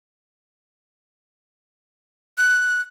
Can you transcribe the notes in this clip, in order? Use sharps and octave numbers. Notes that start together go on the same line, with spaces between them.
F#6